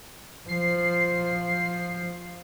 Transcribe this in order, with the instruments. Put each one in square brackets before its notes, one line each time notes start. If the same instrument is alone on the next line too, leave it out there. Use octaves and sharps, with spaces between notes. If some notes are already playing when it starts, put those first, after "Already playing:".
[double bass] F3 [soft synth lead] C7